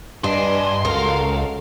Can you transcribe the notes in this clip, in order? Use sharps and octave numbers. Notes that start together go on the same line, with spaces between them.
G2 D4 B4 D#5 G#5 C6
C#2 F#4 A4 A#4 F5